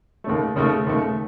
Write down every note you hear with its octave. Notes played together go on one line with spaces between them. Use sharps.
D#2 C#3 A3
D#2 C#3 A3
D#2 C#3 A3